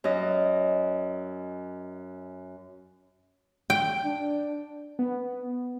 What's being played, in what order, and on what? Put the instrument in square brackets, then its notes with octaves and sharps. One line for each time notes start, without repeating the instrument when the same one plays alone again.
[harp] F#2 D#5
[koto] G5
[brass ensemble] D4
[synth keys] B3